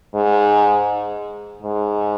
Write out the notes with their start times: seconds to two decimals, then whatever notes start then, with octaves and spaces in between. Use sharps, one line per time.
0.15 G#2
1.63 G#2